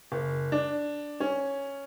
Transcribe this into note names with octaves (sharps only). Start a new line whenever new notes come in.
F#1
D4
C#4